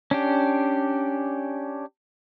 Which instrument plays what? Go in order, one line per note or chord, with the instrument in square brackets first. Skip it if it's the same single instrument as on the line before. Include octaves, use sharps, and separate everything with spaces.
[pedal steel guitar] C#4 D4 G4